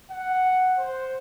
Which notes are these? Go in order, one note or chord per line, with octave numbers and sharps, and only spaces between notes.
F#5
C5